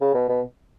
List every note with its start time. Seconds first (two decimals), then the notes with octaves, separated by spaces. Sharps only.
0.01 C#3
0.14 B2
0.29 B2